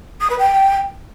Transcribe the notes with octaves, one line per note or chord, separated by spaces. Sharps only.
D#6
B4
G5